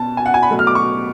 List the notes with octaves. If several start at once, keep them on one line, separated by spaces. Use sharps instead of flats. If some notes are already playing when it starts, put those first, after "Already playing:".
Already playing: B2 B3 A5
G#5
F#5
G#5
B5
B2 F#3 A3
F6
D6
C#6